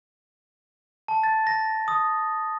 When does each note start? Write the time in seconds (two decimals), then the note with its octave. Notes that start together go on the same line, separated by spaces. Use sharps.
1.08 A5
1.24 A6
1.47 A#6
1.88 D#6